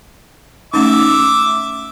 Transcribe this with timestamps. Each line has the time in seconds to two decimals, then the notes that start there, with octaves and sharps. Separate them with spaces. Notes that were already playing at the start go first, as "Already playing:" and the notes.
0.74 A3 C#4 D#4 E5 D6